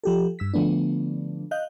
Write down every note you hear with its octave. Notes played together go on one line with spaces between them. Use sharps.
F3 G4 A4
G2 E6 B6
D3 F3 A3 B3 D4
D#5 F5 F#6 G6